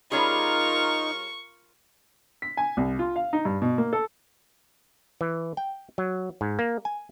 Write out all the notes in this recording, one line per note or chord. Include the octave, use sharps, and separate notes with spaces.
G3 C#4 D#4 F4 G#4 A#4 C#6
B6
G#5
C2
F4
F5
D#4
G2
B2
A#3
A4
E3
G5
F#3
G#2
A#3
G#5